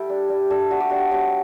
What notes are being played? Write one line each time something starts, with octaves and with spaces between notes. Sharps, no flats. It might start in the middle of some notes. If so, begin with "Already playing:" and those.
Already playing: G3 A3 E4 G4 A4
D4
G3
D4 A4
G3 F#4
G4
D4 F#4
F#3 G4